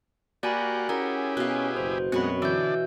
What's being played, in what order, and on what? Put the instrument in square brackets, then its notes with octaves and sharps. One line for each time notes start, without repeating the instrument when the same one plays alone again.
[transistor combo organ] A#3 G4 F#5 [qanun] F#4 [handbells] D5 G#5 B5
[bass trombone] C#4 [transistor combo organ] E4 G4 G#4 [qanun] A#4 [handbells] F#5
[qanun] B2 F5 [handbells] F#6
[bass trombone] F#1 [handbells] C5
[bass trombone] F#2 [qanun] B2 C#5 [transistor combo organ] G#3 F#4 [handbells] C4 B5
[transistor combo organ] D3 D5 [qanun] E3 [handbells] E6 G6